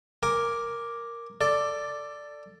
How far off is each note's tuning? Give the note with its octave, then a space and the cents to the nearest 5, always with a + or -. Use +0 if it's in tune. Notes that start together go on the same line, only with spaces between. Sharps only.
A#4 +0 G#5 +0 D6 +0
A4 +20 D5 +0